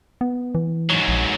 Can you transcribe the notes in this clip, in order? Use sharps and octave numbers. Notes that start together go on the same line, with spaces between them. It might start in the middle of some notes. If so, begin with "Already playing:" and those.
B3
E3
G#2 F#3
A#1